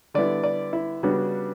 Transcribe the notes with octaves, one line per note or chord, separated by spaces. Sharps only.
D3 G3 B3 E4 D5
D5
E4
C#3 G3 B3 D4 F#4